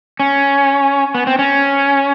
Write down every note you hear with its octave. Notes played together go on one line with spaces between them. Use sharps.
C#4
B3
C4
C#4